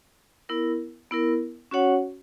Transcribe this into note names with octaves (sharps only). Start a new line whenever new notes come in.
B3 E4 A#4
B3 E4 A#4
C#4 F#4 C#5 F#5